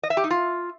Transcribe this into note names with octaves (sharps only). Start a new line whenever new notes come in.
D#5
E5
G4
D#4
F4